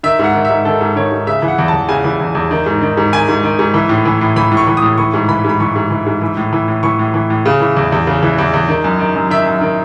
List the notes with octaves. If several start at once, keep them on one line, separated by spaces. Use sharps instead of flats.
D#3 E5
G#2 F#5
D#3
E5
G#2
D#3 A4
G#2
D#3 C#5
G#2
C#3 E5
E3
F#5
E2
A5
E2
C#3 G#5
E3
E2
E2
D#3
G#2
D#3
G#2
D#3 G#5
G#2
D#3
G#2
E3
A2
E3
A2
E3 B5
A2
C#6
E3
D#6
A2
E3 C#6
G#2
E3 B5
G#2 B5
E3 C#6
G#2
E3
G#2
E3
A2
E3
A2
E3 C#6
A2
E3
A2
C#3
E3
E2
E2
C#3
E3
E2
E2
D#3
F#2
D#3
F#2
D#3 E5
F#2
D#3